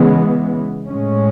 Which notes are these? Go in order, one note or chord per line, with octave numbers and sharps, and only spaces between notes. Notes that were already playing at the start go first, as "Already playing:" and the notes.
Already playing: C#3 E3 G#3 B3
A2 G#3 C#4